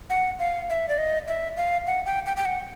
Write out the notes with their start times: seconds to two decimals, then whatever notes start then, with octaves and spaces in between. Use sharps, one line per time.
0.10 F#5
0.39 F5
0.70 E5
0.89 D5
0.98 D#5
1.28 E5
1.57 F5
1.87 F#5
2.06 G5
2.26 G5
2.37 G5
2.45 F#5